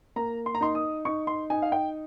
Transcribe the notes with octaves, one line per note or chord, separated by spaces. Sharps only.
A#3 A#5
C6
A#5
D#4 C6
D#6
D#4 C#6
C6
D#4 G#5
F5
G5